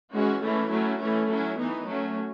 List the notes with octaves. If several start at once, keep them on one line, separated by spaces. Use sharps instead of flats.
E3 G#3 C#4 F#4
E3 A3 C#4 E4
F#3 A3 C#4
E3 A3 C#4 E4
F#3 C#4 E4
E3 B3 D#4
F#3 A3 C#4